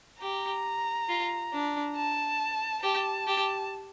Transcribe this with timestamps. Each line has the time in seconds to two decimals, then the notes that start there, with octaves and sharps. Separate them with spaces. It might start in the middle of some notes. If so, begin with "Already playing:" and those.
0.22 G4 A#5
1.09 F4
1.53 D4
1.96 A5
2.83 G4 A5
3.27 G4